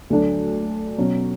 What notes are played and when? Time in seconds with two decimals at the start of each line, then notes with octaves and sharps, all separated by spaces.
0.10 D2 D3 F#3 A3 D4
0.98 B2 F#3 C#4